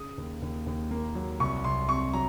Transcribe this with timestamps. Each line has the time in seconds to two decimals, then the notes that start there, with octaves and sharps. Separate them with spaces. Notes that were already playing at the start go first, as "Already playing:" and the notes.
Already playing: C#3 D#6
0.18 D#2
0.42 D#2
0.66 D#2
0.91 A#3
1.15 F#3
1.40 C2 C#6
1.64 C2 C6
1.89 C3 C#6
2.13 F#3 A#5